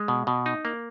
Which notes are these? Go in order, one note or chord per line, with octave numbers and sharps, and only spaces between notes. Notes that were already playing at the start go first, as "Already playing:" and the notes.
Already playing: G#3
B2
B2
D#4
A#3